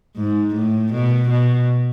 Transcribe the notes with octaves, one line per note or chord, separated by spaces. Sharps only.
G#2
A2
B2
B2